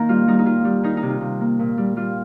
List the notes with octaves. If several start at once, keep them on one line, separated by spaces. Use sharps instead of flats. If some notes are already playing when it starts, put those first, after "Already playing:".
Already playing: D#3 A#3 A#4
G3 F4
G3 D#4
D#4
D#3 F4
G3
D#3 D#4
D#4
C3
F4
C3
A#3
A#2
G3
G3 F4